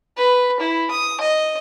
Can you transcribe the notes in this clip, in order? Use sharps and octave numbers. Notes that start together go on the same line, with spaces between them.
B4
E4
D#6
D#5